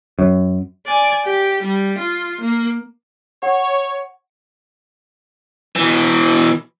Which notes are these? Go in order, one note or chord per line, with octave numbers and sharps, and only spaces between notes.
F#2
D5 G#5
G4
G3
F4
A#3
C#5 F#5
B2 E3